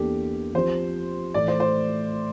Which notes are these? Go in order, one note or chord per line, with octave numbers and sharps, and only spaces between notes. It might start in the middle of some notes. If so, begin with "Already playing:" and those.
Already playing: E2 E3 A#3 D4 G4 A4
F3 C4 G4 C5
A2 E3 A3 D5
C5
C5